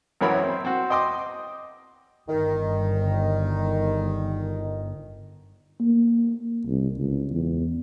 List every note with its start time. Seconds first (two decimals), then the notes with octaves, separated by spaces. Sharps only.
0.21 G#1 F#2 E3 A#4 C#5 B5
0.44 C4
0.65 C4 F#4
0.90 D#5 G5 C6 D6 D#6
2.28 G1 D#3
5.81 A#3
6.66 C2
6.97 C#2
7.31 E2